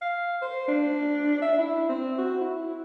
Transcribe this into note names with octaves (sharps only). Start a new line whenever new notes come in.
F5
C5
D4
E5
E4
C4
F#4
E4